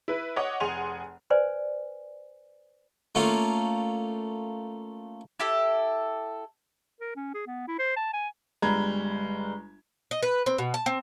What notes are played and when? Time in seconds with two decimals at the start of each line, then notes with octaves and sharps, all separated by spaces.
0.08 E4 B4
0.36 C#5 D#5 F#5 D6
0.60 F1 G#4 F#5 G#5 C6 F7
1.30 B4 C5 D5 G#5
3.15 A3 A#3 C#4 F4
5.39 E4 G4 A4
7.01 A#4
7.16 C#4
7.34 G#4
7.47 B3
7.68 E4
7.79 C5
7.96 A5
8.13 G#5
8.62 G1 G3 G#3 A#5 B5 G#6
10.11 D#5
10.23 B4
10.46 C4
10.58 B2
10.74 A5
10.86 C4